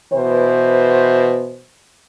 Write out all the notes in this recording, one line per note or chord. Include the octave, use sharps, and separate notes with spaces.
B2 E3 C5